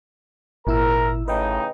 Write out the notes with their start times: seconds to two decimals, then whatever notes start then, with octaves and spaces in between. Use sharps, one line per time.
0.67 G#1 A#2 E4 A#4 A#5 E6
1.28 A2 C#3 D#4 B4 D#5 G5